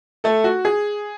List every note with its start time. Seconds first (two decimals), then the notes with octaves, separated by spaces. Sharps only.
0.24 A3 A4
0.44 F#4
0.65 G#4